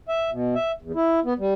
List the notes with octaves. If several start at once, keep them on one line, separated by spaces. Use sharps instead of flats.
E5
B2
E5
E2
E4
B3
G3